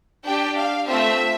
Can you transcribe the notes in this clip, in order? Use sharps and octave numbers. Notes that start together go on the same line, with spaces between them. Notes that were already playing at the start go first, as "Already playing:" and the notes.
D4 G4 G5
F5
A3 C4 F4 E5